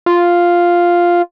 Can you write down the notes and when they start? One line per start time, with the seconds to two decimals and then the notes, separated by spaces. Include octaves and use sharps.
0.06 F4